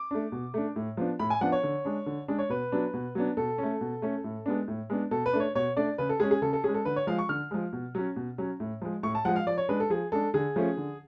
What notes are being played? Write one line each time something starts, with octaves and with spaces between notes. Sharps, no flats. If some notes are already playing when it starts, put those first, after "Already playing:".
Already playing: D6
A3 D4
B2
A3 D4
A2
F3 B3 D4
A2 B5
G#5
F3 B3 D4 F#5
C#5
D3
G#3 D4
D3
G#3 D4
C#5
B2 B4
F#3 B3 D4
B2
F#3 B3 D4
B2 A4
A3 C#4
B2
A3 C#4
A2
G#3 B3 D4
A2
G#3 B3 D4
B2 A4
B4
A3 D4
C#5
B2 C#5
A3 D4 D5
C#3 B4
A4
G#3 C#4 G#4
G#4
C#3 A4
A4
G#3 C#4 G#4
A4
D3 B4
C#5
F3 G#3 F5
C#6
D3 F6
F3 G#3
B2
F#3 C#4
B2
F#3 C#4
A2
F3 G#3
A2 C#6
A5
F3 G#3 F#5
F5
F3 D5
C#5
G#3 D4 B4
A4
F3 G#4
G#3 D4 A4
D3 G#4
F3 A3 C#4
D3